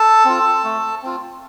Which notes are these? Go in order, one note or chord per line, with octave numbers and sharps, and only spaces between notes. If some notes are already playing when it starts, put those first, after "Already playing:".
Already playing: A4 A5
C4 F4
A3
C4 F4